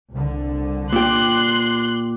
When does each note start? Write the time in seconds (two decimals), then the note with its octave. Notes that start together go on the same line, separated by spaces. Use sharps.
0.12 C2 D3
0.93 A#2 G4 C6 F#6